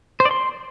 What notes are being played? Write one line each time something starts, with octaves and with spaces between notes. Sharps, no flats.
C5
D5
C6